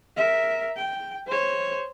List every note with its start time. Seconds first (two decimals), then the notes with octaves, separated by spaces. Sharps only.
0.16 A#4 E5
0.77 G5
1.27 C5 C#5